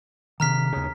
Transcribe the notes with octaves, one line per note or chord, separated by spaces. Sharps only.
C3 D#3 A#5 F6 B6
D#2 C#3